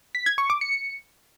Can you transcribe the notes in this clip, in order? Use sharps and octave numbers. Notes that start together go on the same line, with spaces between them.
B6
G#6
C#6
D6
C#7